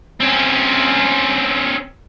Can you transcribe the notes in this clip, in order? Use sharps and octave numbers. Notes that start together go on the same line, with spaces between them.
C4 C#4